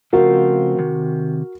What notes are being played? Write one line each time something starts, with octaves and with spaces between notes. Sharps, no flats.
C#3 F3 A3 C4 F4 F#4 A#4
C3 D#3